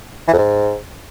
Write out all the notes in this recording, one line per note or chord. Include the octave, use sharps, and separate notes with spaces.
E3
F2
G#2